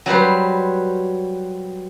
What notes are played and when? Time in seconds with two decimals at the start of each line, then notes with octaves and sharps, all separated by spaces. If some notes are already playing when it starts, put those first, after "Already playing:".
0.06 F#3 G3 B4 C5